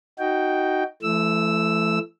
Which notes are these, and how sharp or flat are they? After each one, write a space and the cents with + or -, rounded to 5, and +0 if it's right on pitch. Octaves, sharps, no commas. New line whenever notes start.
D#4 +0 F#4 +15 G5 +0
E3 +35 A3 -15 E6 +0